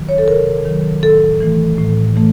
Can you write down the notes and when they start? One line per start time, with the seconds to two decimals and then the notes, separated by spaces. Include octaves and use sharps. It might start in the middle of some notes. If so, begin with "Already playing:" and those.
Already playing: D#3 F#3
0.09 C#5
0.18 A4
0.28 C3 A#4
0.65 D#3 F#3
1.03 A2 A4
1.40 E3 A3
1.78 A2
2.16 E3 A3